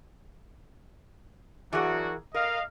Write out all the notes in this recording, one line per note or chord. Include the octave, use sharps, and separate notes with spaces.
E3 F#3 D4 F#4 G#4 A#4
A#4 D#5 F5